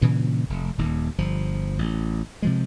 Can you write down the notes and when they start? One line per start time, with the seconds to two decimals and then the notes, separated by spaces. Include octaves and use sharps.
0.01 G2 A#2 C#3 E3
0.49 F1
0.78 D#1 D#2
1.18 G1 F3
1.79 A1
2.42 C3 F3 G#3